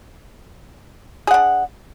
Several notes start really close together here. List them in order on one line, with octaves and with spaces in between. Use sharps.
G#4 F#5 D4